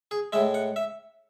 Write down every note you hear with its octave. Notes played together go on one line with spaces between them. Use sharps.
G#4
A2 G#3 E5
F#5
E5